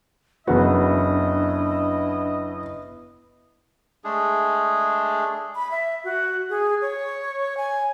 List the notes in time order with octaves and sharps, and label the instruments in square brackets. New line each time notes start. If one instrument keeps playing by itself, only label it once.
[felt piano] F#1 F#4 [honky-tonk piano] B3 [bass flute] D4 [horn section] E4 D#5
[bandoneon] G#3 A3 D4 G#4
[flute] B5
E5
F#4
G#4
C#5
G#5